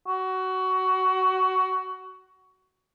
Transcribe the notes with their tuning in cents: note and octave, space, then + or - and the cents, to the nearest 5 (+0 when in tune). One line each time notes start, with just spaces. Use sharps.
F#4 +15